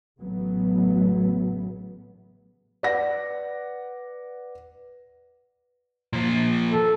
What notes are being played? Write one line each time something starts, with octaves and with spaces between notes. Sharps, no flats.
A1 A2 C#3 F#3 A3 B3
B4 D5 F#5 A#6
A#2 F3
A4